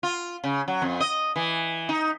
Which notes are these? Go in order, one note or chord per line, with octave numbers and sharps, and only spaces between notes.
F4
C#3
F#3
F2
D#5
E3
D#4